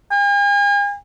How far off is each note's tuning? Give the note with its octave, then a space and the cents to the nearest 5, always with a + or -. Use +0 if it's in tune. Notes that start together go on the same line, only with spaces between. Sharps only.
G#5 -45